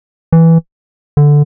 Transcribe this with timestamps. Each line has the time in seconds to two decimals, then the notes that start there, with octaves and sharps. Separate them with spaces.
0.33 E3
1.17 D3